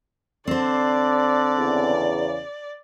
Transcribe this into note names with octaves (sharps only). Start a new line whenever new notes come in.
D3 C4 C5 D5
E2 C#3